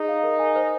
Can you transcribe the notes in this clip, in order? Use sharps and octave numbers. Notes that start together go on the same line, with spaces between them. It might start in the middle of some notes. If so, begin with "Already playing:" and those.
Already playing: D#4 G#4
F5
A#4
G#5
C5